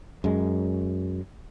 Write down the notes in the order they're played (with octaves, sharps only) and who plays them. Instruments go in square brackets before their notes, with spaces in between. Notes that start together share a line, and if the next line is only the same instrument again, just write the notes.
[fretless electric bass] F#2 G#3